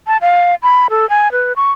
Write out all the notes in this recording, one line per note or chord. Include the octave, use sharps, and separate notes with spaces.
A5
F5
B5
A4
G#5
B4
C#6